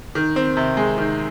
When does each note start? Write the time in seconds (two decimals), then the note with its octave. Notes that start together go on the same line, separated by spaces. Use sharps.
0.15 D#3
0.36 C4
0.57 C3
0.77 G#3
0.98 D#3